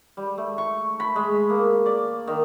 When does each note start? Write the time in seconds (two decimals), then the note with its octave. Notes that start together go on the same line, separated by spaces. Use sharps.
0.17 G3
0.38 A3
0.58 C#6
1.00 B5
1.16 G#3
1.50 A#3
1.86 D5
2.27 D#3